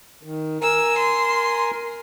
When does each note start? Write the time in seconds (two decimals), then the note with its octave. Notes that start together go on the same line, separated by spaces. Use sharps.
0.23 D#3
0.62 A#4 G#5 A#5 E6
0.98 C6